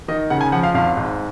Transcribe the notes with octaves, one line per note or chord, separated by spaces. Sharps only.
D#3 D#5
C#3 F#5
G#5
F3 F#5
F5
G#1 F5
G#2